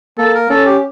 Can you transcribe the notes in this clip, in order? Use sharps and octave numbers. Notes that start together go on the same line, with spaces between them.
A#3 A4
A#4
C#4 A4
G4